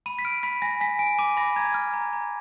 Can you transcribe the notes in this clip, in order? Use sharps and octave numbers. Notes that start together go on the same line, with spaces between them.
B5 D#7
B6
F6 D7
B5 B6
G#5 A#6
G#5 B6
G#5 D7
D6 D#7
B5 A#6
A#5 G#6
F6
A#5
A#5